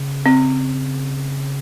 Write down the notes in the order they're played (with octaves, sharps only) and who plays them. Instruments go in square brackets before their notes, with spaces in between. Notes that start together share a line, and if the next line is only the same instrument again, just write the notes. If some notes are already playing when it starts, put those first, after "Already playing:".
Already playing: [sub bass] C#3
[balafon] C4